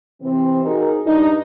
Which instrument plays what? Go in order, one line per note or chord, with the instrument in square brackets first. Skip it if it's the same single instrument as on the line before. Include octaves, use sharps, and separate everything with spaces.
[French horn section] C3 E3 C4
D#4 F#4 G#4 A#4
G2 D4 D#4